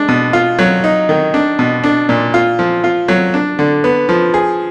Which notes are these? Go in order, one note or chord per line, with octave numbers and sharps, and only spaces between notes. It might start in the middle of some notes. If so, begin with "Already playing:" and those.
Already playing: G#3 D4
B2
F4
F#3
D#4
D#3
D4
B2
D4
A#2
F4
F3
F4
F#3
D4
D3
B3
F3
G#4